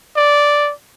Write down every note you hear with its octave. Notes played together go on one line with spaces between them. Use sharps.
D5